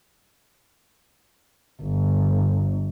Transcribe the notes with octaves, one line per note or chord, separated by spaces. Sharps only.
G1